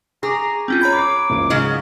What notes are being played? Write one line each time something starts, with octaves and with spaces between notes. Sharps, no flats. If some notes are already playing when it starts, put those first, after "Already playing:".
G#4 A#5 C#6 D6
C4 C#4 F4 G5
C#5 A#5 B5 G#6
B5 D6 F#6 C7
F#1 C#2 D7
G#2 C#3 F#3 D#5